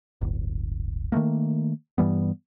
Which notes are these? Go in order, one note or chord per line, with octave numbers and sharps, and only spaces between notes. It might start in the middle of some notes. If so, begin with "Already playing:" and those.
D1 G1
D#3 E3 A3 A#3
G2 E3 G3 B3